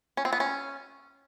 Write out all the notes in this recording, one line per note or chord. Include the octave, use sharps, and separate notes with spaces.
C#4
C4
B3
C#4